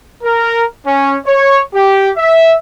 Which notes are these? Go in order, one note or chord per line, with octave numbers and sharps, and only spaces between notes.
A#4
C#4
C#5
G4
E5